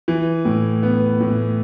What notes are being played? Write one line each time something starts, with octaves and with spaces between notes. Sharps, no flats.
E3
A2
B3
A2